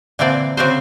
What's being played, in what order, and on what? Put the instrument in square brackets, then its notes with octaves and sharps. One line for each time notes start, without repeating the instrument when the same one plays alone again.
[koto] A#2 D3 E3 C4 D5
C#3 C4 F#4 G4 A#4 C5